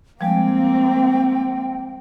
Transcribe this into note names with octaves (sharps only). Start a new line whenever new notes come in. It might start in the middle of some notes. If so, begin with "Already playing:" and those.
F3 G3 G#3 A#3 C4 G5